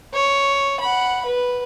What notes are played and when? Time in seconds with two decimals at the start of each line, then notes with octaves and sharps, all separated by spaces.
0.14 C#5
0.80 F#5 B5
1.26 B4